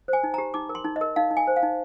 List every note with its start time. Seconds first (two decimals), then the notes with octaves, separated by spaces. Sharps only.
0.08 C5
0.13 G#5
0.23 D#4
0.34 G4 A#5
0.54 D#4 D6
0.69 A#4
0.75 C6
0.85 D#4
0.96 D#5
1.01 A#4
1.16 D#4 F5
1.31 D#4
1.37 G#5
1.47 C5
1.56 F5
1.63 D#4